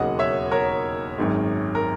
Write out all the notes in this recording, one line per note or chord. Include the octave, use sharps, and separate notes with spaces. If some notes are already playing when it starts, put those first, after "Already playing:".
Already playing: E1 D#2 C#3 F#3 D#5 F#5
C#5 E5
A#4 C#5
G#1 F#2 D#3 G#3
A#4